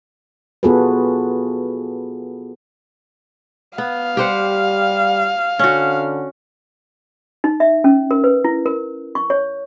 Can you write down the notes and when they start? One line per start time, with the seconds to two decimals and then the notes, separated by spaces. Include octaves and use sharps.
0.63 B3 F4 F#4 G#4 A4 B4
3.78 B3 F5
4.17 G3 G4 C5 F#5
5.59 D3 C#4 F#4
7.44 D#4
7.60 E5
7.84 C#4
8.11 A#4
8.24 B4
8.45 E4
8.66 A#4
9.15 C#6
9.30 C#5